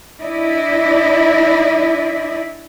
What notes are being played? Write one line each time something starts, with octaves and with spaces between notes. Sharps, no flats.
D4 E4 D5 D#5